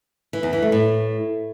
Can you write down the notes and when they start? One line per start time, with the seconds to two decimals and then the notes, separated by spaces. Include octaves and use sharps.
0.33 E3
0.43 E2
0.53 E3
0.62 A3
0.72 A2